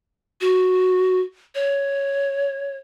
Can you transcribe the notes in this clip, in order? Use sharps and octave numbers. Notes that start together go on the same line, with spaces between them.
F#4
C#5